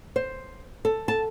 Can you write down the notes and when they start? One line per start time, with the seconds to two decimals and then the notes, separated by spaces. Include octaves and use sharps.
0.16 C5
0.85 A4
1.08 A5